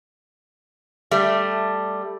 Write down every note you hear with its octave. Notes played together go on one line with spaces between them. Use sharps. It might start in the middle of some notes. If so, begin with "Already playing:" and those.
G3 A3